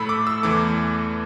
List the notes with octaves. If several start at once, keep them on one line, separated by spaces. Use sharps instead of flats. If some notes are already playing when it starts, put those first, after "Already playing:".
Already playing: A2 A3 B5 E6
D6
E6
E2 E3 A3 D6